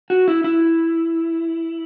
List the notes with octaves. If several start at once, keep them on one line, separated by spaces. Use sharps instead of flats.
F#4
E4
E4